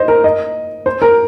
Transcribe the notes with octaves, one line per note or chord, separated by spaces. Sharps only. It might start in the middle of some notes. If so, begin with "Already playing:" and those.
Already playing: C5 D#5
A#4
D#5
C5
A#4